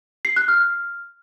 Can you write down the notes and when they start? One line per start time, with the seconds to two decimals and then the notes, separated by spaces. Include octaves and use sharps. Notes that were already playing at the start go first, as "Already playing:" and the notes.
0.25 C7
0.36 F#6
0.48 F6